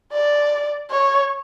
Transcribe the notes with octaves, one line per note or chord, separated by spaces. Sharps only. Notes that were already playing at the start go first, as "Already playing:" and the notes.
D5
C#5